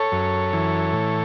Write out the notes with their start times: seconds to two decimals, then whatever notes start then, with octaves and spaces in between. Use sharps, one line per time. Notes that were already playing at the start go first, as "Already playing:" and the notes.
Already playing: A4 C#5
0.12 F#2
0.53 E3
0.93 A2